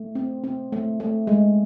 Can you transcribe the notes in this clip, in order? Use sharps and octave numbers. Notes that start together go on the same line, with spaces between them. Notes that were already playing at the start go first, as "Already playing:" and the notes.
Already playing: A3
C4
C4
A3
A3
G#3